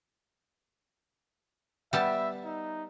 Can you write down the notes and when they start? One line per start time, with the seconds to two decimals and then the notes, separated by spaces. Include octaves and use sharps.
1.93 G3 B3 E5 A5
2.45 D#4